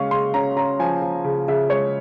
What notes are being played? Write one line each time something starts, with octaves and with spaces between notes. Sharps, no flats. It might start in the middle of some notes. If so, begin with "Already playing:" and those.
Already playing: C#3 G#3 C#4 F5 C#6
C#3 C6
C#4 A#5
C#4 A#5
F3 G#5
F3
C#3
C#3 E5
G#3 C#5